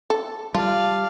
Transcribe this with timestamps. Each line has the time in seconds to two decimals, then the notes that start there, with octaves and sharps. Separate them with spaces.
0.10 A4
0.54 G3 F4 D5 F5 A5